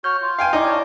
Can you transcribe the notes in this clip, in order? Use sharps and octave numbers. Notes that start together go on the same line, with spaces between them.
F#4 C#5 F6 G6
F4
F5 G5 G#5
D#4 E4 D5 D6
C#5 F5 A5